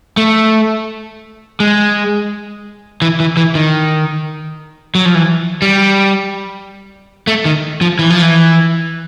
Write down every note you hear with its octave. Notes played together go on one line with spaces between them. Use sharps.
A3
G#3
E3
E3
E3
D#3
F#3
F3
E3
G3
A3
D#3
F3
E3
F3
E3